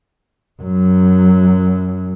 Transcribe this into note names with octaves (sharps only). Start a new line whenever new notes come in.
F#2 F#3